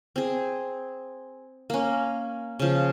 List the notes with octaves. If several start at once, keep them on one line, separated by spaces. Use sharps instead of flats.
C4 G#4
A#3 C#4
C#3 F3